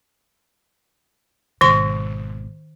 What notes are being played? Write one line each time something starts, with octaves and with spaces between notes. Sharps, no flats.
G#1 B2 D#3 C6